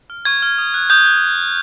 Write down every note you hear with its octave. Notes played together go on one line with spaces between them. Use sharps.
F6
C#6 G#6
F6
D#6
F#6
D#6 G6
F#6